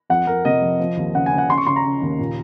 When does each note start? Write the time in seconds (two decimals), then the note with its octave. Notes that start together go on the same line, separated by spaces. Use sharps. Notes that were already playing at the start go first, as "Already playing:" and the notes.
0.10 F2 F#5
0.27 F2 A#4
0.45 C3 D#5
0.62 F3
0.80 F3
0.97 D#2
1.14 C#3 F#5
1.26 G#5
1.32 C#3
1.38 F#5
1.50 C#3 C6
1.58 C#6
1.67 C#3 C6
1.76 A#5
1.84 C#3
2.02 D#2
2.19 A#2